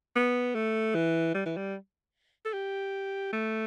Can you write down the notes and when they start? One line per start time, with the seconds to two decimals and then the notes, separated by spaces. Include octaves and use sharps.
0.16 B3
0.55 A3
0.95 E3
1.35 G3
1.46 E3
1.57 G3
2.45 A4
2.53 G4
3.33 A3